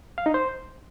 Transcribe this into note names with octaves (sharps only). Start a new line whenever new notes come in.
F5
D#4
C5